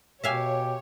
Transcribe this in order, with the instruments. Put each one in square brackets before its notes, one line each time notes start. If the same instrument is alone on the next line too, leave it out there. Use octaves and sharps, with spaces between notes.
[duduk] B2 [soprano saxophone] G4 [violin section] C#5 [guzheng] E5 F5 G#5